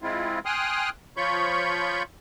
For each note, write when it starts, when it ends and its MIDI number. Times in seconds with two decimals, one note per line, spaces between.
0.02 0.39 56
0.02 0.39 60
0.02 0.39 64
0.02 0.39 65
0.46 0.89 79
0.46 0.89 80
0.46 0.89 84
0.46 0.89 87
0.46 0.89 89
0.46 0.89 90
1.17 2.03 53
1.17 2.03 65
1.17 2.03 73
1.17 2.03 83
1.17 2.03 85
1.17 2.03 91